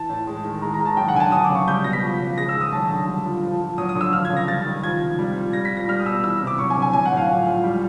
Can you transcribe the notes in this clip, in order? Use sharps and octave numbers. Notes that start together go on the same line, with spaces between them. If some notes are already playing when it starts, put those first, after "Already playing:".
Already playing: E3 A5
A2
G#3
D#3
G#3 A#5
A#5
D#3
A5
F#3 G5
F#5
D3 G#5
A5
F#3 D#6
D6
C#3
C#6
G3 G6
B2 A#6
B6
F3
C#3
G#3 A#6
E6
D#3
D#6
F#3 A5
D3
G3
A#2
F3
A#2
F#3 D#6
D#6
D3
E6
F3 F6
G#6
C#3
A#6
G3 A6
D#3
F3 G#6
C3
G3
A#2
G3 A#6
B6
A#2
A#6
G3 F6
D#6
B2 E6
E3 E6
C3
D6
F#3 C#6
G#5
D3
G#5
F#3 G#5
F#5
A2
F5
F3
A#2
G3